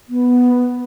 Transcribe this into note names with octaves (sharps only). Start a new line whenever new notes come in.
B3